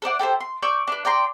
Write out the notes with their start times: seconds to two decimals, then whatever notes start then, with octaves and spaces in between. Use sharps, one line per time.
0.02 A4 C5 D5 F#5
0.19 G4 A4 A#4 C5
0.40 C6
0.62 D5 C#6 E6 G6
0.88 D4 B4
1.05 D5 G5 A#5 C6